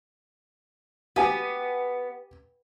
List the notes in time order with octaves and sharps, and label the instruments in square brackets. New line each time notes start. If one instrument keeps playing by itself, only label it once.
[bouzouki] B3 [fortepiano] G4 G#5